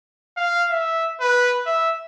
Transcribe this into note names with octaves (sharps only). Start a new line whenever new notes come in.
F5
E5
B4
E5